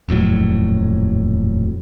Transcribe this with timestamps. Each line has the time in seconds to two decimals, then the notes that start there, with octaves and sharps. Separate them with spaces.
0.09 D#1 F2 A2 F#3